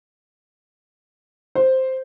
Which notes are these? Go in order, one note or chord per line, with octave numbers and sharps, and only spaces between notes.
C5